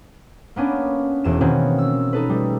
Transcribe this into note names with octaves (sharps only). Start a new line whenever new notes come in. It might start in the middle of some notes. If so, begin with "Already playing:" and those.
A#3 B3 C#4 D4
E1 E2 E7
B2 D#3 A#3 C4 C#4 F#4
E6
D#4 A4 B4
G3 A3